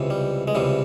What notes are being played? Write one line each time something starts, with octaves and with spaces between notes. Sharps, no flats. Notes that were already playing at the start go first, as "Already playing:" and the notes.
Already playing: C#2 C3 E3
G3
G#3
C#2 C3 E3 G3